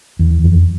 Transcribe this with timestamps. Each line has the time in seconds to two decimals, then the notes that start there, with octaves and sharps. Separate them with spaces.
0.19 E2
0.44 F2